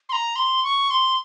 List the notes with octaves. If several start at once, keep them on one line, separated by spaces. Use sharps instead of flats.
C6
A#5
C6
C#6
C6